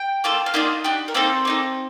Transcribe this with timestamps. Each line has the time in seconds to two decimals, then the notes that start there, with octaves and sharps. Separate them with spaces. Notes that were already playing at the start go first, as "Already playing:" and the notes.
Already playing: G5
0.24 A#3 D4 F4 A4
0.46 F5
0.54 A#3 D4 D#4 F4 D#5
0.84 D4 G4
1.08 A#4
1.14 A#3 C4 D#4 A4 C5
1.45 A#3 D#4 A4